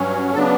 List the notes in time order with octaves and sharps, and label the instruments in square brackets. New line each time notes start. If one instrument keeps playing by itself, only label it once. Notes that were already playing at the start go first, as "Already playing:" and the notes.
Already playing: [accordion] G2 F#3 C#4
C#3 F#3 B3 D4 A4